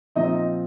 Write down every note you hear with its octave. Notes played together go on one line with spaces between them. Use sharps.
A#2 F3 C4 D#4 D#5